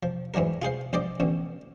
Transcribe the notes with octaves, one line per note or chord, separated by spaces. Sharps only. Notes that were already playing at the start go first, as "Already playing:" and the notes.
F3
G#2 E3 F#3 D4 A#4
F4 G#4 C5 F5
A#1 C5 D5 D#5 D6
A1 B2 D3